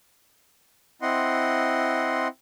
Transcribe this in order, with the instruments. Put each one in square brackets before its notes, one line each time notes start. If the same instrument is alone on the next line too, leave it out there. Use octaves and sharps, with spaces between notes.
[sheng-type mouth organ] C4 E4 D#5 F#5 C6